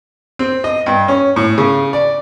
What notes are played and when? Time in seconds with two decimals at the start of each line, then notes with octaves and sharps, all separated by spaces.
0.39 C4
0.64 D#5
0.86 G2
1.08 C#4
1.36 A2
1.58 C#3
1.93 D5